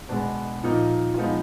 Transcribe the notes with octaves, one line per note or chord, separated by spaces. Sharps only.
B2 G#3 B3 D4
A#2 F3 A#3 D#4
F4
F3 G#3 B3 D#4